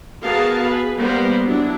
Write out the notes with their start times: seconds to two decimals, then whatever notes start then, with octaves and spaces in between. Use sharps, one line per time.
0.23 B3 F#4 G#4 A#4 F5 A5
0.64 G#4 B4
0.97 G3 A#3 B3 A#4 C5
1.45 F#3 D4 E4